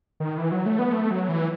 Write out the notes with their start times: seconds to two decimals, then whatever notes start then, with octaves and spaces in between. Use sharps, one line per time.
0.20 D#3
0.38 E3
0.52 F#3
0.66 A3
0.79 B3
0.93 A3
1.11 F#3
1.29 E3